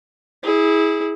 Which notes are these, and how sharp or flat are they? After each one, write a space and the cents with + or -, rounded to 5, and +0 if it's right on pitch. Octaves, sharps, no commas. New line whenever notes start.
E4 -20 G#4 +0